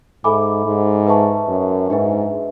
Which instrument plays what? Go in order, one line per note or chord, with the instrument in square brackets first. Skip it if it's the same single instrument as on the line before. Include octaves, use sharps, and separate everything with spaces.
[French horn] G#2 [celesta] A4 E5 G#5 B5 D6
[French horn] G#2
[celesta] B4 E5 A5 C#6
[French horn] F#2
[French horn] G#2 [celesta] D4 G#4 B4 E5